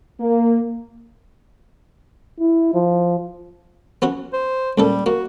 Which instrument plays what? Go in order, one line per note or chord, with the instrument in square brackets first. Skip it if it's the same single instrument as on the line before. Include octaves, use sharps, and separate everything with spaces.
[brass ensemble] A#3
[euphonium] E4
F3
[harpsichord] B3 C#4 F#4
[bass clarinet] C5
[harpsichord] C#2 A#2 A4 [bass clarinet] G3
[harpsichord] A#3 [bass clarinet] F#4